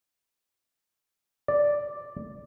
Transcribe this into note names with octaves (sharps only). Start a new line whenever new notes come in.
D5